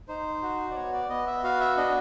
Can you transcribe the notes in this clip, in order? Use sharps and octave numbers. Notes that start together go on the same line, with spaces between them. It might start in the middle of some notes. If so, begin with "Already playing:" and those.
D#4 C5
F#4
D5
B3 C#5
D5
B3 D#5
E5
F#4 F5
E5
D4 D#5